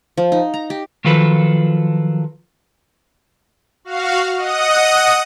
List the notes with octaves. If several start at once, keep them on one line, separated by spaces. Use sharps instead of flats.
F3
D#4
A#5
G4
D#3 F3 F#3 F4 A4 B4
F#4 F5
D#5 F#5 D#6